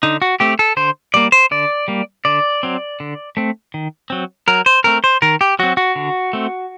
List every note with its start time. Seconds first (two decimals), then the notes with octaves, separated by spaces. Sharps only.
0.03 D3 D#4
0.22 F#4
0.40 A3 C4 G4
0.59 A4
0.77 D3 C5
1.14 G3 A#3 D5
1.32 C5
1.51 D3 D5
1.88 G3 A#3
2.25 D3 D5
2.63 F#3 C4
3.00 D3
3.37 A3 C4
3.74 D#3
4.10 F#3 C4
4.48 F#3 A#4
4.66 C5
4.84 A3 C4 A#4
5.04 C5
5.22 D#3 A#4
5.41 G4
5.59 F#3 C4 F#4
5.77 F#4
5.96 D3
6.33 A3 C4